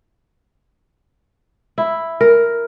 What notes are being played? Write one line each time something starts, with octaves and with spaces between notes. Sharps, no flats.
E4
A#4